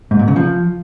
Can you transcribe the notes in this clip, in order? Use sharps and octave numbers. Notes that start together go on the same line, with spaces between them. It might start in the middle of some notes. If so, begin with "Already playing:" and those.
G#2
A#2
C#3
F3